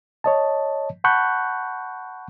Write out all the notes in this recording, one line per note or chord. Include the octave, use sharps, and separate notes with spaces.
C#5 D#5 A5
F#5 A5 B5 C#6 F#6 G6